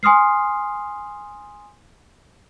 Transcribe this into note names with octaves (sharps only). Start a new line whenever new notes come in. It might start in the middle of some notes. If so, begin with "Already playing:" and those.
G#5 C6 D#6 F6 C7